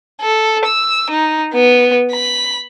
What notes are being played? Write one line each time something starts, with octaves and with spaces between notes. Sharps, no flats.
A4
E6
D#4
B3
B5